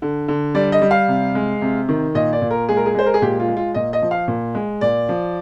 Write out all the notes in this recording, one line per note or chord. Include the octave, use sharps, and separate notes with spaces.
D3
D3
G3 D5
D#5
G3
F5
C3
G#3
C3
D#3
A#2 D#5
D5
A#2
A#4
G#3 G#4
A#4
G#4
G#3 C5
A#4
G#4
A#2 G4
F4
G#3
F4
A#2 D#5
D#5
F3
F5
A#2
G#3
A#2 D5
F3